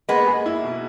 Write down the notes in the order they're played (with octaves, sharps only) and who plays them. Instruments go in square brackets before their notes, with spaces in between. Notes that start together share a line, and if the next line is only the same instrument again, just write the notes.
[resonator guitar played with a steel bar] G#3 B3 [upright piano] A#3
[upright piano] G#4
E4
B2